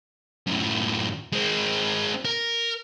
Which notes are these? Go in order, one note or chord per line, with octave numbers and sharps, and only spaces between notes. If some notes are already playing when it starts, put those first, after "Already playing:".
F#2 A2
G#3 C4
A#4